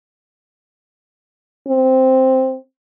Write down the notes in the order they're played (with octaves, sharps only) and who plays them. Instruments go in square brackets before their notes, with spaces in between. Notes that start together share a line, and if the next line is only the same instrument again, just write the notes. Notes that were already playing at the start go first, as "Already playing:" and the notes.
[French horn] C4